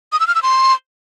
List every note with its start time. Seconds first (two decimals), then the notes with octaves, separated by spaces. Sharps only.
0.12 D#6
0.20 E6
0.28 F6
0.35 E6
0.43 C6